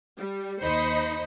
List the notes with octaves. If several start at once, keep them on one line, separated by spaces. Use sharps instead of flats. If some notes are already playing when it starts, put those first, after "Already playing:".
G3
D#2 D#4 C5 D#5 B5 C#7